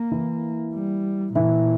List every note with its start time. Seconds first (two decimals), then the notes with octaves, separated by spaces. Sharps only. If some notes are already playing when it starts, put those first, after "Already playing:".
Already playing: A#3
0.12 E3 E4
0.74 G3
1.35 A#2 E3 E4